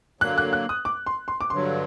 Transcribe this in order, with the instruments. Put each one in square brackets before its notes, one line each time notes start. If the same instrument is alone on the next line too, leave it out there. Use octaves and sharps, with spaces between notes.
[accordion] D3 F#3 A#3 [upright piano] F#6
[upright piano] F#6
F#6
D#6
D6
C6
C6
D6
[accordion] G2 D3 F#3 [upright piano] C6